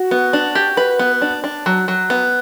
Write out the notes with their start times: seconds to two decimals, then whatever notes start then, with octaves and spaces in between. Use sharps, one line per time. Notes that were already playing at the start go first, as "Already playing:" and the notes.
Already playing: F#4
0.11 B3
0.33 D4
0.55 G4
0.77 B4
0.99 B3
1.22 D4
1.44 D4
1.66 F#3
1.88 F#3
2.10 B3